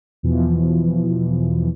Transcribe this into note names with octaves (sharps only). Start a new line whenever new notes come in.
E2 B2 E3 F3